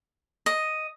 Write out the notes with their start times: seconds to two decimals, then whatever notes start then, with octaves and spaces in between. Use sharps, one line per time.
0.46 D#5